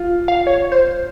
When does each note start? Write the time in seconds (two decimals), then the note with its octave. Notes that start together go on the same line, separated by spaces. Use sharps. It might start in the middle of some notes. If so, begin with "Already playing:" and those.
Already playing: F4
0.28 F5
0.47 C#5
0.72 C5